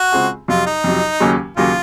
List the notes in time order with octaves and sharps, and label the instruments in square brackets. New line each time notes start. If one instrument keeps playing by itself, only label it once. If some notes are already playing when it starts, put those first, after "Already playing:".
Already playing: [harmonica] F#4
[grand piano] C#3 G#3 C4 F4 G#4
[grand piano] F2 C3 F#3 [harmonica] F4
[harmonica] D#4
[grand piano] F2 C3 F#3
D#2 C#3 F#3 A#3 C#4
[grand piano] D#2 C#3 F#3 A#3 C#4 [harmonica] F4